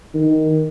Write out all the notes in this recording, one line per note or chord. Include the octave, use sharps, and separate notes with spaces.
D#3